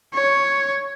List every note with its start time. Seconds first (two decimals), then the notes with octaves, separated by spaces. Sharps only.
0.14 C#5